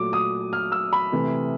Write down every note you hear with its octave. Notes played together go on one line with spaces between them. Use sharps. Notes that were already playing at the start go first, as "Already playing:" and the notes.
Already playing: A#2 F#3 A3 D6
D#6
F6
E6
B5
C3 E3 A3